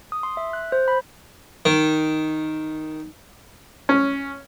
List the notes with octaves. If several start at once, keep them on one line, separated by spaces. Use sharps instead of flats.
D#6
C6
E5
F#6
C5
B5
D#3
C#4